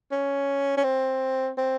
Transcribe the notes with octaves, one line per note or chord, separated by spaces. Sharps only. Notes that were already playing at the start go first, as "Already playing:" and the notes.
C#4
C#4
C4
C4